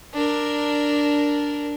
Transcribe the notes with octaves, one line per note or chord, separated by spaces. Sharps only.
D4 A#4